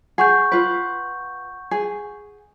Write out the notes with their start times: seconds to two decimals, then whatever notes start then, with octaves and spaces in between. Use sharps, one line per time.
0.18 G#4 F#5 C#6 G6
0.52 F4 B4
1.71 G#4